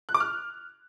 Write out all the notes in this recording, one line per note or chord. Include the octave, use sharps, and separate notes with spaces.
F#6
D6
F6